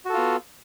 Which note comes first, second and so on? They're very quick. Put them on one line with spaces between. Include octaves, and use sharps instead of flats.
F#4 A4 F4 B3